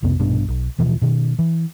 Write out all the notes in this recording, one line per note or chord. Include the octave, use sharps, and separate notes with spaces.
B1 F2 C3 B3
A#1 G2 B2 D4
B1
D#1 B2 E3 F3
B2 D#3
E3